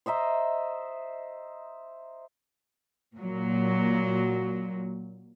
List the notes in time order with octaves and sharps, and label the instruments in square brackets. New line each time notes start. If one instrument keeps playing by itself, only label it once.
[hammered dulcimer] C5 D#5 E5 A#5
[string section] A#2 F#3